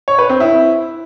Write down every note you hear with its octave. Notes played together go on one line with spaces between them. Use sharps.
C#5
B4
C4
E4